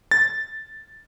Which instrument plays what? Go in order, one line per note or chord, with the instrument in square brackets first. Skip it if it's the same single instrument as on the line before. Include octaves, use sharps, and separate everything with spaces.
[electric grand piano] A6